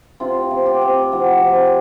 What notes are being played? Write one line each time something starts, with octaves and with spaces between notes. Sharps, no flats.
C3 F4
C3
G4
C3
F3 F#4
C3